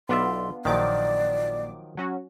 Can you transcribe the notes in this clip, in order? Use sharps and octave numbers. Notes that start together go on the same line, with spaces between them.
B1 B3 D4 F4 D5 E5 C6
A#1 A#2 D#3 F3 F#3 D5 D6
F#3 C#4 F#4